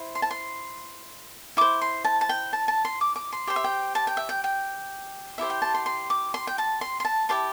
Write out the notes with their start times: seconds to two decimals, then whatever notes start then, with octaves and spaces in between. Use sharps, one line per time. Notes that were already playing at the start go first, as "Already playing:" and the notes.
Already playing: E4 C5
0.15 C6
0.22 A5
0.31 C6
1.57 E4 C5 D6
1.82 C6
2.04 A5
2.21 A5
2.29 G5
2.53 A5
2.68 A5
2.85 C6
3.01 D6
3.16 D6
3.32 C6
3.47 G4 C5 G5
3.56 E5
3.64 G5
3.95 A5
4.07 G5
4.17 E5
4.29 G5
4.44 G5
5.38 E4 G4 C5 E5
5.50 G5
5.62 A5
5.74 C6
5.86 C6
6.10 D6
6.34 C6
6.47 G5
6.58 A5
6.81 C6
7.00 C6
7.05 A5
7.29 E4 G4 C5 A5